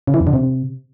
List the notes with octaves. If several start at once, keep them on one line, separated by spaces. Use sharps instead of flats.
C#3
E3
E2
D3
C3